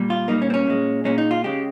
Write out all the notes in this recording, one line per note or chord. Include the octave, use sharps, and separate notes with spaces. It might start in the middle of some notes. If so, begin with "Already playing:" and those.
Already playing: A#2 G3
F4
A#2 G3 A#3 D#4
C#4
C4
C#4
A#2 G#3
A#2 G#3 C#4
D#4
F4
C#3 G#3 G4